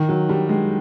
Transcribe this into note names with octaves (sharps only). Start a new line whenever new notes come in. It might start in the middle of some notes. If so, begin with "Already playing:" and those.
Already playing: D#3
F#3
G3
G#3